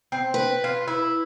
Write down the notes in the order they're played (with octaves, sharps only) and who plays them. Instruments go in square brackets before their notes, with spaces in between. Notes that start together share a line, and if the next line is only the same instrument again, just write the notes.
[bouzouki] C4
[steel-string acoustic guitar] B4
[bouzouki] F4
E4